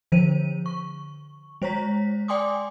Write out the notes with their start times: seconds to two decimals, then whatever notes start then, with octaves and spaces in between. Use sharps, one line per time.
0.12 D3 F3 C5 D#7
0.66 C#6
1.62 G#3 C5 C#5 A#5 B6
2.28 D5 G5 G#5 C6 D6 D#6